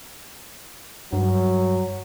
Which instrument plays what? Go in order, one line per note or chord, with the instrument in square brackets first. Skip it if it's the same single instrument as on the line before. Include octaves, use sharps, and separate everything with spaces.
[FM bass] G2 [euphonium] F#3